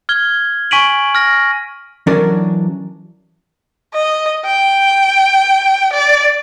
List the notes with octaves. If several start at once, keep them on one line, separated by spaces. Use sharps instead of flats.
F6 G#6 G7
G#5 C#6 B6 D7 D#7 F#7
F6 A#6
E3 F#3 C#4 D4 A#4 D5
D#5
G5
D5